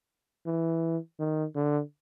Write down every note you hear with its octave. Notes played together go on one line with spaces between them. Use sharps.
E3
D#3
D3